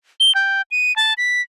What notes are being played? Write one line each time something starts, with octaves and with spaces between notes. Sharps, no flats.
G7
G5
D#7
A5
B6